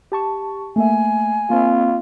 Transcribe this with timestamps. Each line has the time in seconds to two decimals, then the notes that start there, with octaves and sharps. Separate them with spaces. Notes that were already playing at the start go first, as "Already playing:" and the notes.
0.12 G4 A5 C#6
0.76 A3 A#3 E5 G#5
1.50 A#3 C4 F4